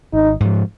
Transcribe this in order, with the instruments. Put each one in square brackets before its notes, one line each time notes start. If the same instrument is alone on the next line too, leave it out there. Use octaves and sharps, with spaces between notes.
[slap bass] G#1 [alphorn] D#4
[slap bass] G#2 F3